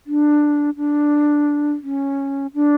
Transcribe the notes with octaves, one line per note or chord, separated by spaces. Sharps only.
D4
D4
C#4
D4